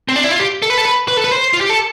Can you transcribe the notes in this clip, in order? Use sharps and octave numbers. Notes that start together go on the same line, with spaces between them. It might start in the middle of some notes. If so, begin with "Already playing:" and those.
C4
D4
E4
F4
G4
A4
B4
A4
B4
B4
A4
B4
C5
F4
G4
A4